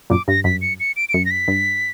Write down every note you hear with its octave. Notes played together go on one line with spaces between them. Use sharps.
F#2 A#2 D6
G2 A#6
F#2 B6
C#7
C#7
D7
D7
F#2 C#7
A#6
B6
G2